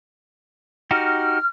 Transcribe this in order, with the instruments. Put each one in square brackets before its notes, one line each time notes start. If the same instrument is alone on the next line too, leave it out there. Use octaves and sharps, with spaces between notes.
[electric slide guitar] D#4 F#4 G4 [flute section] F6